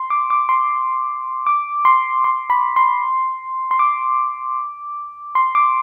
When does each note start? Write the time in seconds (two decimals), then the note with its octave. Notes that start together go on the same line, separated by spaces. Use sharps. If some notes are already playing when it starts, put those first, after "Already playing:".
Already playing: C6
0.10 D6
0.30 D6
0.49 C6
1.47 D6
1.85 C6
2.24 C6
2.50 B5
2.76 C6
3.71 C6
3.79 D6
5.35 C6
5.55 D6